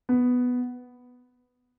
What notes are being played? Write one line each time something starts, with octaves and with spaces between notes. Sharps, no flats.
B3